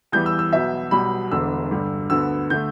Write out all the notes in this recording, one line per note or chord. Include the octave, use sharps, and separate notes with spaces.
E2 E3 G3 G6
E6
E6
B1 B2 B3 E5
B1 B2 G3 B5
E1 E2 D3 E6
G2 D3 G3
D2 D3 B3 E6
D3 A3 G6